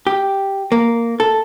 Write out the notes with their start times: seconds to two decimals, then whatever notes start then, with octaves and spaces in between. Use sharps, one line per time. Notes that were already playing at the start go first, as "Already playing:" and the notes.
0.07 G4
0.72 A#3
1.20 A4